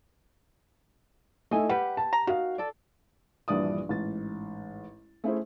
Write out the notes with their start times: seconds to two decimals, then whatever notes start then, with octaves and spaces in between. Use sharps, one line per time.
1.51 A3 D#4 E4 G#5
1.69 G3 G4 B4 F#5
1.97 A5
2.13 A#5
2.27 D#3 F#4 F5
2.58 A4 D5
3.48 A#1 G2 E3 D4 D5 D#6
3.89 A1 G#2 A6
5.24 A3 C#4 E4 G#4 C5